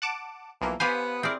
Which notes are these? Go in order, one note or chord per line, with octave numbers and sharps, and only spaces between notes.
F#5 A5 D6
B1 E3 F3 A#3
B3 G4 C5 F5 G#5 B5
C4 E4 G#4 A#4 D5